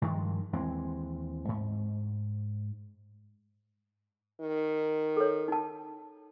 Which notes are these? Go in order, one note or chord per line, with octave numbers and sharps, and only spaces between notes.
G2 D#3 F3 G#3
D#2 E3 G#3 C4
G#2
D#3
A4 C#5
D#4 A5